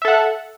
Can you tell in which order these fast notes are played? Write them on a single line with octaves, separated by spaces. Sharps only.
E5 A4 F#5